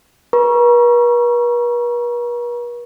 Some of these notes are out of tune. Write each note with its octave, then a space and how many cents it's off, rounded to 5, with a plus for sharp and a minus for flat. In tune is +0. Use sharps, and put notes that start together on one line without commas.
B4 -45 A#5 +35 C#6 +0